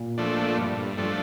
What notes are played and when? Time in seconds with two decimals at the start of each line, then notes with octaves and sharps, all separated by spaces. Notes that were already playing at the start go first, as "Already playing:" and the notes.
Already playing: A#2
0.18 F3 A3 D4
0.58 G2
0.98 F3 A3 D4